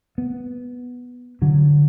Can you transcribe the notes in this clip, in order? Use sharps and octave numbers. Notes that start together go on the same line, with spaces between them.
B3
D3 F#3